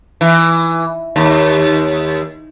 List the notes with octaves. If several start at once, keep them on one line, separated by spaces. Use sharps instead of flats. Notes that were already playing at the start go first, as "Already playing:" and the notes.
E3
D#2